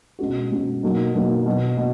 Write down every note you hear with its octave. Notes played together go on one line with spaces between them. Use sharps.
B2 G#3 C#4 F#4
B2 G#3 C#4 F#4
B2 F#3 A#3 D#4
B2 F#3 A#3 D#4
B2 F#3 B3
B2